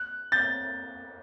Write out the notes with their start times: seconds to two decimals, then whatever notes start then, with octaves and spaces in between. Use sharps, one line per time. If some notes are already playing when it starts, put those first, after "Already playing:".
Already playing: F#6
0.32 G6 A6